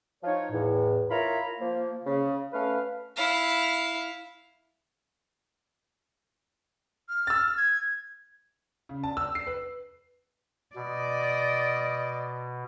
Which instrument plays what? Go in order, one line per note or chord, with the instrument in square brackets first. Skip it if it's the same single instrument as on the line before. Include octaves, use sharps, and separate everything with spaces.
[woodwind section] F3 D#4 F4 C#5
E2 A2
E4 F4 A#4 C#5 A#5 B5
F3 A#3
C#3
A3 C#4 B4 F5
[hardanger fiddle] E4 F5
[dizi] F6
[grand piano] E6 A6
[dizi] G#6
[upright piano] C#3
A5
E6
C7
B4
[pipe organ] B2 [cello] D5 [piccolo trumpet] D#5